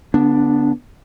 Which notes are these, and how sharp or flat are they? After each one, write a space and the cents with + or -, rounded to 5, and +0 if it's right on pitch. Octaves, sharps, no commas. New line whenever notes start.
D3 -45 B3 +0 D4 +0